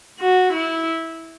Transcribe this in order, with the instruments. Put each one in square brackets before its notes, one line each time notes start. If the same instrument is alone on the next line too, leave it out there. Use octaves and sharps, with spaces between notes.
[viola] F#4
E4